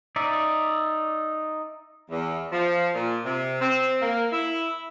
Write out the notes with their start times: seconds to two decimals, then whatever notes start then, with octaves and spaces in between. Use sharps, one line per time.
0.16 D#4 D5 E5
2.11 E2
2.52 F3
2.94 A#2
3.25 C3
3.61 C4
4.01 A#3
4.32 E4